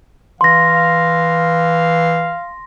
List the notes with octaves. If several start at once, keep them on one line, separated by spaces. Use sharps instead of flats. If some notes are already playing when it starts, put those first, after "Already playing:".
E3 F5 C6 A#6